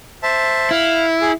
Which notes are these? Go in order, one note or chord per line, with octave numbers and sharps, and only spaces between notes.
C5 E5 A5
E4 F5
G#4